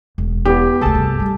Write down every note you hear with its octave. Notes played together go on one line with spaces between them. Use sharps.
E1
E2 B3 G4
D2 C#3 G#4 A4 A5
G2 C3
G3